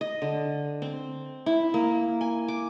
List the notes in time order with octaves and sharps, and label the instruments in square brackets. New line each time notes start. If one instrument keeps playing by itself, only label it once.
[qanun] D#5
D3
C4
E4
A#3
G#5
D6